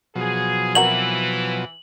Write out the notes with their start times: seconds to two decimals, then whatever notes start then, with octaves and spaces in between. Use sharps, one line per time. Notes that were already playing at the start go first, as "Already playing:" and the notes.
0.15 B2 F3 F#3 G#4
0.75 E3 C4 F#4 A#4 F#7